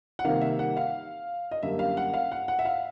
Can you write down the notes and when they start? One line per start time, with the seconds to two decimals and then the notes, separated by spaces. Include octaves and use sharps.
0.19 F#5
0.25 C3 D#3 G3 A#3 F5
0.41 E5
0.59 F#5
0.77 F5
1.51 D#5
1.63 F#2 D3 G3 A#3 E5
1.79 F5
1.97 F#5
2.14 F5
2.32 F#5
2.48 F#5
2.59 E5
2.65 F5